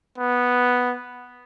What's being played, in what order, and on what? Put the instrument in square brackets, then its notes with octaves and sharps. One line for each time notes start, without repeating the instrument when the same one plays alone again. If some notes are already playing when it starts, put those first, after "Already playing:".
[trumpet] B3